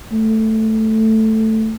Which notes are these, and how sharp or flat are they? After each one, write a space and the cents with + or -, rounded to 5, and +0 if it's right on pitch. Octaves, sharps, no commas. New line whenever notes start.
A3 +0